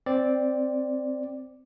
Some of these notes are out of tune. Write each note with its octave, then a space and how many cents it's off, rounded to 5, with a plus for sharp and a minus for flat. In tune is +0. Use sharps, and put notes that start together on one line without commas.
C4 +0 D5 +0